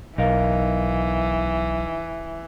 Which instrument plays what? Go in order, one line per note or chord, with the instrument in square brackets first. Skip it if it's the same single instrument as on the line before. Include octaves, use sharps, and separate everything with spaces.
[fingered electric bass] B1 [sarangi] E3 [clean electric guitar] D#4 A#4 F5